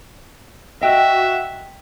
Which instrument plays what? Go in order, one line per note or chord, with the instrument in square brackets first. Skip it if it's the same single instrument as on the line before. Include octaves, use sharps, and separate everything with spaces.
[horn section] F#4 E5 [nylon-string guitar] D#5 G5